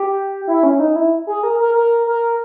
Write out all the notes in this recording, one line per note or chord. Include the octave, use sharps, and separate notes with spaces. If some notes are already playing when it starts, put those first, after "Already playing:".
Already playing: G4
E4
C#4
D#4
E4
G#4
A#4
A#4
A#4
A#4